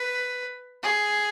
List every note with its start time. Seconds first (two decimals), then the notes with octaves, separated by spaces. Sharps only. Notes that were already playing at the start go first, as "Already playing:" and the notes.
Already playing: B4
0.83 G#4